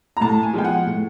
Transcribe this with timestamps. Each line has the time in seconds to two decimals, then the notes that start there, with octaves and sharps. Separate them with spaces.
0.17 A#5
0.21 A2 A5
0.43 G#5
0.53 F3 G#3 B3 G5
0.64 F#5
0.86 A2